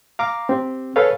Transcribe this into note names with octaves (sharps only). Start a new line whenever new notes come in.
F5 A#5 D6
C4 G4
G#4 A4 B4 C#5 F5